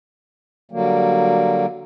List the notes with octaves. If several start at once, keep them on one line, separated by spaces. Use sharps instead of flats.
D3 F#3 G3 A#3